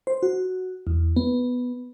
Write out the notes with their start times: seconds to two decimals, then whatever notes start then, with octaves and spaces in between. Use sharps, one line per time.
0.07 C5
0.23 F#4
0.87 E2
1.16 B3